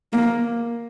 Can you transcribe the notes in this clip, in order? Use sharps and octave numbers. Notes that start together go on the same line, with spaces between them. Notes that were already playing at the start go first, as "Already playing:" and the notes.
A#3